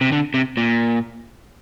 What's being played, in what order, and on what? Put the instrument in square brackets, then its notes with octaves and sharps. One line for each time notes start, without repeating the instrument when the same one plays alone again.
[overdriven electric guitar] C3
D3
C3
A#2